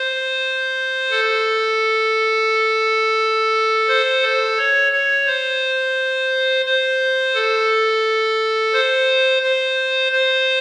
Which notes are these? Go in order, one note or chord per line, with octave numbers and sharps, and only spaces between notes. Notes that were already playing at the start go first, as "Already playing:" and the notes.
Already playing: C5
A4
C5
A4
C#5
C#5
C5
C5
A4
C5
C5
C5